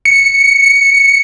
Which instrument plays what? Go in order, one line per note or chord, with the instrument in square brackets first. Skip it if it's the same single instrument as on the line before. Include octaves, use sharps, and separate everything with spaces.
[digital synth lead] C#7